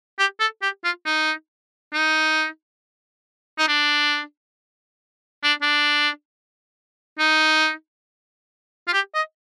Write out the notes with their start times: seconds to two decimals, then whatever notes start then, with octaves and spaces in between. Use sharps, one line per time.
0.19 G4
0.40 A4
0.62 G4
0.84 F4
1.05 D#4
1.93 D#4
3.58 D#4
3.68 D4
5.43 D4
5.62 D4
7.19 D#4
8.87 F4
8.93 G4
9.15 D#5